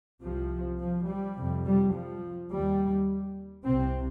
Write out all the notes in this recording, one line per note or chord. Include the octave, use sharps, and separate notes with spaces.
C2 C3 F3
F3
G3
F2 C3
G3
F3
D#2 G3
C2 C3 C4